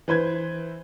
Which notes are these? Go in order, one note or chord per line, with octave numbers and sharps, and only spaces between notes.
E3 B4 C5 G#6